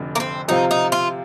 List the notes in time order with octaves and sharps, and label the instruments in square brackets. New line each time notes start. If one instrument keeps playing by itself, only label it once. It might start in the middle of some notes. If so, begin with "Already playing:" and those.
Already playing: [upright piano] F1 F2 D3
[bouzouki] A#3
C4
[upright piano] C3 F3 C4 F4 [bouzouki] D#4
[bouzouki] D#4
F4